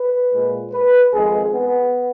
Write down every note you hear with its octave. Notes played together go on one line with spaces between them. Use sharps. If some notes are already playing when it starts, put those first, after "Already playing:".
Already playing: B4
A#2 G#3
B4
F2 D#3 G#3 G#4
B3